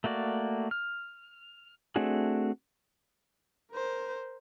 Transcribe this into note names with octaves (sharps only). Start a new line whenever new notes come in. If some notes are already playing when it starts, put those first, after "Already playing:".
A3 A#3 F#4 D5
F6
A3 C4 D4 F#4 G#4
A#4 C5